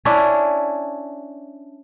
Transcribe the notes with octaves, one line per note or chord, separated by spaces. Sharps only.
C#4 D4 E4